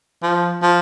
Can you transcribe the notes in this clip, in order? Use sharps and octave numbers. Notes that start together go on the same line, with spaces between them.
F3
F3